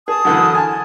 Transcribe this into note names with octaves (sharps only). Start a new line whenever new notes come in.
G#4 A5 D#6
F#2 D3 E3
G#5 A5